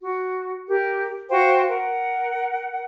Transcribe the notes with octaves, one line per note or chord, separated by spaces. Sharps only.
F#4
G4 A#4
F#4 C5 F5 G5
A#4 F#5